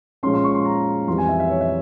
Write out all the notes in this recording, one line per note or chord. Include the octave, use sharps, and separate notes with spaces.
A#2 F3 G#3 C#4 C6
C6
C#6
C6
A#5
F2 E3 G3 C6
G#5
E5
E5
C#5
E5